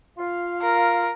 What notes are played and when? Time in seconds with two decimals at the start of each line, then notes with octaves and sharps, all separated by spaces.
0.17 F4 F5
0.62 A#4